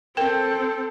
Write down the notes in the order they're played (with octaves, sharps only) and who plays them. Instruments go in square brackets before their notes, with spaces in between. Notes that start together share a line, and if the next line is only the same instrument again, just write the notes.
[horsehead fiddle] C4 A4 [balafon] A#4 G5